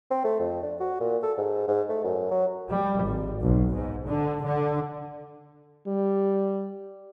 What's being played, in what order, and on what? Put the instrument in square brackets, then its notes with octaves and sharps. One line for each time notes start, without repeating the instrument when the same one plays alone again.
[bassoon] C4
A3
F2
D4
F#4
A#2
A4
G#2
G#2
A3
F#2
F#3
[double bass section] G3
G#1
B1
G#2
D3
D3
[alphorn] G3